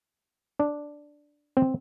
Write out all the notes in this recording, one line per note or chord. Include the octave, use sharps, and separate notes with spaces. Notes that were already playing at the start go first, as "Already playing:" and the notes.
D4
C4